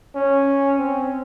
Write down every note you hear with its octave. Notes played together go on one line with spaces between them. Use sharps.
C#4
C4